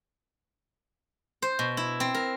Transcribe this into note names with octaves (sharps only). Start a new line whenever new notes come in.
C5
B2
E4
C4
A#4